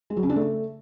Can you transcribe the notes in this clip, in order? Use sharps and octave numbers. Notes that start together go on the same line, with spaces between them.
G#3
F#3
C#3
D4
A3